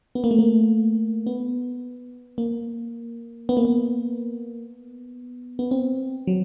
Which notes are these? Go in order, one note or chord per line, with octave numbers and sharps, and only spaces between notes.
B3
A#3
A3
A#3
B3
A#3
B3
A#3
B3
B3
C4
F#3